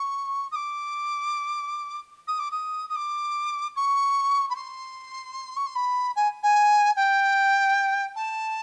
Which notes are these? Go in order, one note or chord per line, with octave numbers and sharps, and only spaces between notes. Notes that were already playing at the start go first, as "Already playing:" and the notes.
Already playing: C#6
D#6
D6
D#6
D6
D#6
D#6
D6
C#6
B5
C6
C#6
C6
B5
G#5
G#5
G5
A5